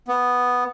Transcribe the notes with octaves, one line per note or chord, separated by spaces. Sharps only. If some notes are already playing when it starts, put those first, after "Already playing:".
B3